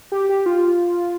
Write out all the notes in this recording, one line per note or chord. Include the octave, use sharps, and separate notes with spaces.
G4
G4
F4